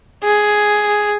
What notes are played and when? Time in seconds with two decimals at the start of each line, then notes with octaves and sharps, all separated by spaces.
0.23 G#4